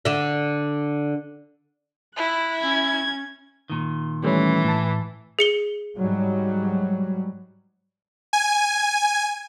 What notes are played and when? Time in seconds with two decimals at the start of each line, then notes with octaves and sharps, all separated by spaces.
0.05 D3 E5
2.16 E4 F#6
2.60 C#4 G#6
3.70 A#2 D#3
4.23 E3 G3 A3 C#4
4.65 A2 A5
5.39 G#4 C#7 G7
5.97 G#2 F#3 G3
8.33 G#5